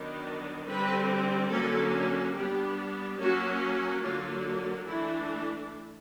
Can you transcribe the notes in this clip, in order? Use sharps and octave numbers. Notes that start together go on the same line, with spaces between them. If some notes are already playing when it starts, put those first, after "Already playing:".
Already playing: D#3 F#3 B3 D4
D3 G3 C4 B4
D3 F#3 A#3 C#4 A4
G3 B3 D4 G4
F#3 A#3 C#4 F#4
D3 F#3 A#3 D4 F4
E3 A3 D4 E4